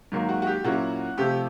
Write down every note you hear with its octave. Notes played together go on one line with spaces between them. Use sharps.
G#2 D#3 F#3 A#3
F#4
F#4
G4
A#2 F#3 A#3 C#4 E4 F#4
C3 F3 A3 C4 F4 G4